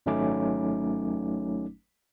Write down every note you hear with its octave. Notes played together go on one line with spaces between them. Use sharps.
G#1 F#3 A3 C#4 D#4 D6